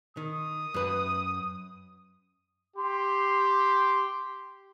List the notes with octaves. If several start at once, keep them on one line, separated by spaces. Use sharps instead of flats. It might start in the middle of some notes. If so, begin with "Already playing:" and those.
D#3 D#6
F#2 B4
G4 C6